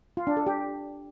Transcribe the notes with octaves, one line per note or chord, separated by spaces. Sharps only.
F4
D4
A4
G4